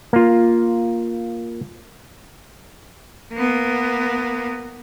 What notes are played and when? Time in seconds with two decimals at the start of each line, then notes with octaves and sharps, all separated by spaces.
0.13 A#3 F4
3.33 A#3 B3